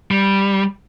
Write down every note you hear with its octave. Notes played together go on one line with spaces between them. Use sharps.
G3